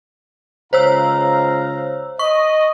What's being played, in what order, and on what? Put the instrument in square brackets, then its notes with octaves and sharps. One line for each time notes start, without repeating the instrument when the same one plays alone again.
[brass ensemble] C#2 F5 A#5 [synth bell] C5 C#5 E6
[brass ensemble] D#5 [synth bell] C#6